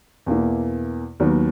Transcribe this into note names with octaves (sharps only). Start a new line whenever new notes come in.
E2 B2 A#3 E4
D#2 D#3 F#3 B3